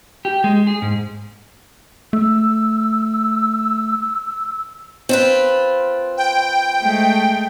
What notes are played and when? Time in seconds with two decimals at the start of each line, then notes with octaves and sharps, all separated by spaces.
0.25 G4
0.44 G#3
0.67 G#4
0.82 G#2
2.13 A3 E6
5.09 C4 F4 B4
6.17 G5
6.81 G#3 A3